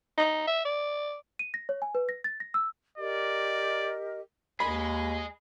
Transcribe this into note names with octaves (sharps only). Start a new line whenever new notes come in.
D#4
E5
D5
D#7
A#6
C#5
G#5
B4
A#6
A6
A#6
E6
G4 A#4 D5 D#5
D#2 G#4 D#5 B5